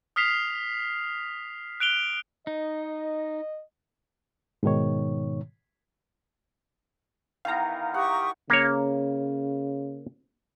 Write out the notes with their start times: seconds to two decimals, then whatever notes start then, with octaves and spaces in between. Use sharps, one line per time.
0.16 D#6 F6 B6 C7 F7
1.80 F#6 D7 F7 G7
2.47 D#4 D#5
4.63 G#2 B2 D#3 C#5
7.45 D#3 E3 B3 F5 A#5
7.94 G4 F#5 C#6 D#6
8.50 C#3 A#3 C#5